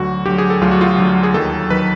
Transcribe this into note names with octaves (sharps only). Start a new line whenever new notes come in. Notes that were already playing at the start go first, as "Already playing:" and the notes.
Already playing: D2 D3 F#3 F#4
D2 D3 F#3 G4
G#4
A4
D2 D3 F#3 F4
F#4
F4
D2 D3 F#3
G#4
D#2 D#3 F#3 A4
D#3 F#3 B4